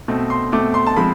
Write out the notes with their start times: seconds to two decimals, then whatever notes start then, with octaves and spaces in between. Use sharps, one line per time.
0.08 B2 A3 C4
0.30 C6
0.52 B2 A3 C4 D6
0.74 C6
0.87 A5
0.96 F3 G#3 C4 B5